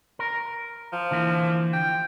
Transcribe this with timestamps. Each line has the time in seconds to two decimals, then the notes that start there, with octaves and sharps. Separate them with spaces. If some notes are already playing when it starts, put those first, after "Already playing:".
0.19 A#4
0.93 F3
1.11 D3 E3 A#3
1.73 G5